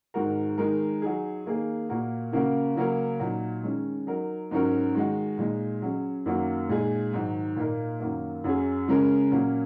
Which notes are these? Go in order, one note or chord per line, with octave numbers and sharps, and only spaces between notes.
G#2 D#3 G#3 F#4 A#4
D#3 G#3 D#4 A#4
F#3 D#4 G#4
D#3 A#3 D#4 G#4
A#2 A#3 F#4 A#4
C#3 A#3 F#4 A#4
C#3 F#3 A#3 C#4 A#4
A#2 F#3 D#4
D#3 G#3 C#4
F#3 D#4 A#4
G#2 F#3 C#4 F#4 A#4
D#3 G#3 F#4
A#2 G#3 D#4
F#3 C#4 G#4
F#2 D#3 F#3 A#3 F#4
A#2 G#3 D#4 G#4
G#2 D#3 F#3
A#2 A#3 D#4 A#4
F#2 D#3 F#3 A#3
F#2 F#3 C#4 G#4
C#3 G#3 C#4 A#4
A#2 F#3 A#3 C#4